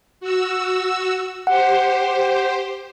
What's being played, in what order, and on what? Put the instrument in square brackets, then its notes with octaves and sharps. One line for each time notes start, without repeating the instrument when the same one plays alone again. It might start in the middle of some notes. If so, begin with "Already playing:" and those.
[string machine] F#4 E6
[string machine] G4 C5 [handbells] F#5